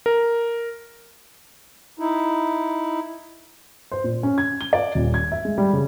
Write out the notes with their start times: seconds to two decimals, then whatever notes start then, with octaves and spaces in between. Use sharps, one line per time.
0.06 A#4
1.99 D#4 E4
3.91 C5
4.04 A#2
4.23 C#4
4.38 G#6
4.61 G7
4.73 D5
4.95 D#1
5.14 G#6
5.32 E5
5.45 G#3
5.58 G3
5.73 C#3